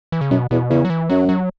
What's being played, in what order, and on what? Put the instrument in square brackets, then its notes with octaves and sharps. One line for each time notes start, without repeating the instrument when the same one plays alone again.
[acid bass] E3
C#3
[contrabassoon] F#2 [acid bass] B2
[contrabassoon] E2 [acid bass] B2
[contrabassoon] E2 [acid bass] C#3
[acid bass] F#3
E3
[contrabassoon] F#2 [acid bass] F#3
[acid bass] F#3